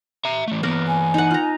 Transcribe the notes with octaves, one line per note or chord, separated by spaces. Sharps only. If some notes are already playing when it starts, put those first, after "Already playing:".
E5 A#5
E3 A3
E3 A#3 B3 A#4
G#5
D#4 F#5
F4 A#5